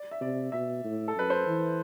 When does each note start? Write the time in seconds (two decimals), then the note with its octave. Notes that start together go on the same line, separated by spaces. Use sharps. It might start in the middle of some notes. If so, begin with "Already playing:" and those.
Already playing: D5
0.11 E5
0.21 C3 D5
0.52 B2 E5
0.84 A2
1.08 A4
1.16 F#2 B4
1.30 C5
1.47 E3